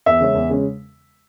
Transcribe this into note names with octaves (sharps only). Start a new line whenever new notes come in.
E2 E5
C#3 G#3 C#4
E2
C#3 G#3 C#4